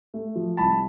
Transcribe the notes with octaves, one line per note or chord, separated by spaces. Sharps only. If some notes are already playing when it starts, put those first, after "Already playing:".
A3
F3
C2 A5 B5